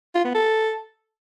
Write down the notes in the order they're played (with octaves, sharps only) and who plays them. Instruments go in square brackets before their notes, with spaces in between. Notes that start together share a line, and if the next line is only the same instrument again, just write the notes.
[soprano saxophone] F4
B3
A4